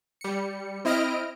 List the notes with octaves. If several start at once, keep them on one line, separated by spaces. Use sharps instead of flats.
G3 C#7
C4 E4 D#5 F6 A#6 D7